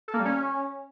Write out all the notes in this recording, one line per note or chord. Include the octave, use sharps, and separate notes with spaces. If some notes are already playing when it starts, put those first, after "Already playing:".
A4
A#3
G3
C#4